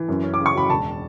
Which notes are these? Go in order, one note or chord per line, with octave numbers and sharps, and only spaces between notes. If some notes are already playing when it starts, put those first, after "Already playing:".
Already playing: E3
F#2
C#4
D6
C#3
C#6
F#3 B5
E1 A5